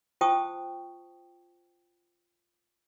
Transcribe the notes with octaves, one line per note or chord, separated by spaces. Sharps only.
F4 C5 G5 A5 C#6 D#6